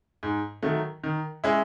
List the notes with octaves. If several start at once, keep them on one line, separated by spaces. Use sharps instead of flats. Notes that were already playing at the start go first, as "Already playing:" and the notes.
G#2
D#3 F#3 A3
D#3
G#3 C#4 E4